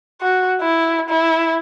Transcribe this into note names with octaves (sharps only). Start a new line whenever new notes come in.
F#4
E4
E4